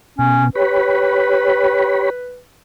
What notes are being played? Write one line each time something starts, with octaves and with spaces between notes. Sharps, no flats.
B2 C#4
G4 B4 C#5 B5